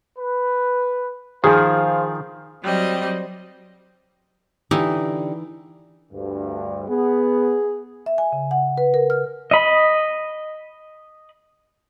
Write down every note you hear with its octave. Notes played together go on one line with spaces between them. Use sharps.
B4
D#3 F3 G#4 C5 F5
F#3 G3 C4 D#5
D3 E3 D#4 G4
D2 G2
B3 G#4
E5
G#5
C#3
F#5
B4
A#4
F6
D#5 B5